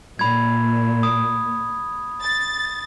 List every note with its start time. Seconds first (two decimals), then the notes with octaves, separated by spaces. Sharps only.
0.19 A#2 B5 G#6
1.03 D#6
2.21 A6